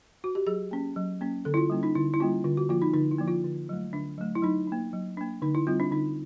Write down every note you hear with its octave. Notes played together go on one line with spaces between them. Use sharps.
F#4
G4
F#3 G#4
A#3 C#4
F#3
A#3 C#4
D3 A4
E4
F4
G3 A#3 C#4
D#4
D3 E4
E4
G3 A#3 C#4 F4
D3 F4
F#4
F3 A#3 F4
D#4
D3 D#4
E4
F3 A#3
F4
D3
F#3 A3
D3 D4
F#3 A3
E4
F#3 D#4
A#3 D4
F#3
A#3 D4
D3 D#4
E4
G3 C4 F4
D4
D3 D#4